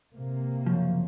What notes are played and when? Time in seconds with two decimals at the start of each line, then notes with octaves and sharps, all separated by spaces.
0.15 C3 A#3
0.67 F#2 C#3 F3